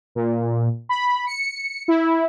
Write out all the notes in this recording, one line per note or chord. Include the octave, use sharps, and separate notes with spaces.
A#2
B5
C#7
E4